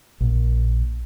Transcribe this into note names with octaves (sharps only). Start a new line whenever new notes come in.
A#1 A#2